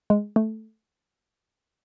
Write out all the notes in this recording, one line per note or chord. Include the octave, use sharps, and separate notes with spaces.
G#3
A3